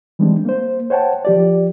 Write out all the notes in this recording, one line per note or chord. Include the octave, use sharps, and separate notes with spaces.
E3 G3 G#3 C4 D4
A#3 C5
C5 C#5 F#5 G5 A5
F3 G4 D5